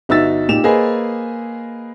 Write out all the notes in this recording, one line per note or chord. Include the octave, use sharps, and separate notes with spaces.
G1 D#4 F#4 E5 E6 A6
A#2 D#4 G4 E7 F7
A#3 G#4 B4 C5 D#5 G#5